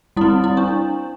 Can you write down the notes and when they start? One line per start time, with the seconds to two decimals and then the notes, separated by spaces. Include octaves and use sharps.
0.17 G3 C4 E4
0.44 E4
0.57 D4